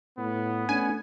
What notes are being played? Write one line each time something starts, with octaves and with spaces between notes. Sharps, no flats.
A2 B3
A3 C#4 D4 G#5